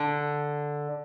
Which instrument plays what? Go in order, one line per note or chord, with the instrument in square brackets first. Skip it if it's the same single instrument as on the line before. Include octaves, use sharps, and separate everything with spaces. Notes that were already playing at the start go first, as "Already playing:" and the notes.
Already playing: [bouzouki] D3